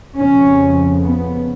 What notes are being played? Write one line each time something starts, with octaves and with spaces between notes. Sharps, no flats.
F2 C#3 C#4
B3